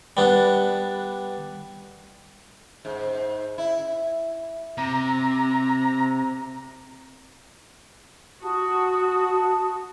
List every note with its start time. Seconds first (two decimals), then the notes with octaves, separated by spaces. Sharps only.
0.17 G3 B3 D4
2.85 G#2
3.58 E4
4.78 C3 A#5
8.43 F#4 A5 D#6